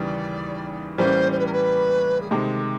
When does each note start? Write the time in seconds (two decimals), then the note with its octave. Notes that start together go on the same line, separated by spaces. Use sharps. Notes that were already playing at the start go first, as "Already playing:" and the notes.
Already playing: D#2 C#3 E3 G3 D5
0.98 A2 E3 G3 A#3 C#4 C5
1.32 C5
1.39 B4
1.46 A#4
1.52 B4
2.21 G#4
2.30 C3 D#3 G#3 A4